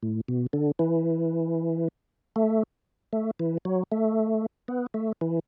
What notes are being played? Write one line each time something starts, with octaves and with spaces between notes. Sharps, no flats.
A2
B2
D3
E3
A3
A3
E3
F#3
A3
B3
A3
E3